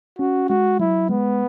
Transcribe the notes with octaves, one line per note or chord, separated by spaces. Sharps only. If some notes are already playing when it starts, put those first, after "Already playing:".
C#4 F#4
G#3 F#4
F#3 E4
G#3 B3